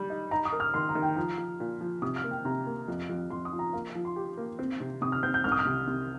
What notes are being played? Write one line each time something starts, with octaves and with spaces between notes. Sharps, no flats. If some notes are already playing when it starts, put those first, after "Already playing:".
Already playing: G3
D#4
D#4 A#5
D#6
A#4
F6
D#3 C6
A#5
D#3
G5
F3 A#5
F3
A#2
F3
C3 D#6
F6
A#3
G5
C3 A#5
A#3
F2
F2
F2 C6
D#6
F3
A#5
A#3 F5
F3
C6
G4
A#3
C4
C3
C3 D#6
F6
C4 G6
G6
C2 F6
D#6
F6
C3
C3